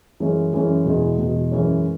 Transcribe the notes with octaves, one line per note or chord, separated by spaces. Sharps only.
F#2 E3 G#3 C#4
F#2 E3 G#3 C#4
E2 B2 G#3
E2 B2 G#3
F#2 E3 G#3 C#4